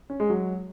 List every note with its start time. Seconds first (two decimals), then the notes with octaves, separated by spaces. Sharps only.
0.10 C#4
0.20 G#3
0.30 F#3